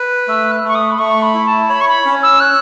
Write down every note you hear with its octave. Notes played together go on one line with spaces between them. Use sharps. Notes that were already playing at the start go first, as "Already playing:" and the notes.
Already playing: B4
A3 E6
F#6
A3 C#6
D#6
B5
A3 C#6
B5
E4
A5
C#5 B5
C#6
B5
C#4
E6
C#5 F#6